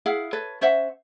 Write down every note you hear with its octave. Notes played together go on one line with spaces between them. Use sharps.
E4 G#4 F5 F#5
A4 B4 C#5
C#4 C5 E5 F#5